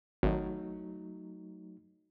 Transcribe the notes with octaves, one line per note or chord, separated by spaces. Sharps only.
G#1 F#3 A3 D#4